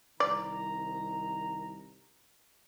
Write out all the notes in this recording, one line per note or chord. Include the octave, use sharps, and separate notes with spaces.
C2 D#3 D5 A#5